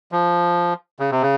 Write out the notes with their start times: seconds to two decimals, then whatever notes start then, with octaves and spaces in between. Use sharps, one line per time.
0.12 F3
0.99 C#3
1.11 C3
1.22 C#3